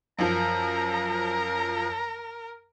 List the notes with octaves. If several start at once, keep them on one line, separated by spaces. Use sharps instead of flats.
F#2 F3 A#4 A#5